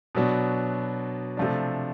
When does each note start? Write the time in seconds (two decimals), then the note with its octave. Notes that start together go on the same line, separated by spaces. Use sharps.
0.15 B2 F#3 B3 D4
1.37 C3 F3 A3 D4